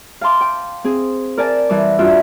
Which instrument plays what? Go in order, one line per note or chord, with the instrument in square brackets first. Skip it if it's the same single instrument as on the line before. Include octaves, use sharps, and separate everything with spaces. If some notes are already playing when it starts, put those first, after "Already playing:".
[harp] F5 G5 A5 C6 D6
G5
C4 G#4
A#4 D5 G#5 A5
E3 G3 A5 D6
G2 D4 F4 F#4 E5 G5